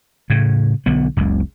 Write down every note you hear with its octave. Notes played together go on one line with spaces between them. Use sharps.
A2 C#3
B1 D3 B3
F#1 C#2